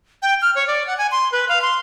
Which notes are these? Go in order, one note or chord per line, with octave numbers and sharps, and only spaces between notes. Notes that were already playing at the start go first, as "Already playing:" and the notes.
G5
F6
C#5
D5
F#5
G#5
C6
B4
F5
C6